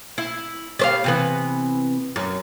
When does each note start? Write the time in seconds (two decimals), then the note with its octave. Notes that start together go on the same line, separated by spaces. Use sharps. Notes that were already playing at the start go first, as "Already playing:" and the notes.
0.18 E4
0.79 G3 C5 F5
1.04 C3 E3 B3
2.16 F#2